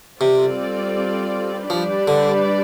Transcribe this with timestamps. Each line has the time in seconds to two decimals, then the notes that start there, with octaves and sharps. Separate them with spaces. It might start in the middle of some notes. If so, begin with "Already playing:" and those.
0.21 C3 G3 C4 F4 A4 D5
1.70 F3 G3 D4 G4 B4 D5
2.08 D3